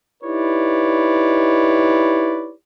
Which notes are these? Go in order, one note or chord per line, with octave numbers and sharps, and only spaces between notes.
D#4 E4 G4 B4 C#5 D5